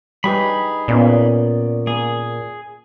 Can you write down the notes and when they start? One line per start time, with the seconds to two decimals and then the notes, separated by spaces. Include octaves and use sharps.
0.24 G3 D#4 G4 G#4 B4 B5
0.88 A#2 B3 C#4 D5
1.87 A#3 G#4